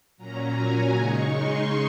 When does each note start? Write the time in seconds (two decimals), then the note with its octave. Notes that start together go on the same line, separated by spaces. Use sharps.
0.17 A#2 F#3 C#4 A#5
0.56 G#5
0.93 C#3 G#3 D#4 C#6
1.31 C6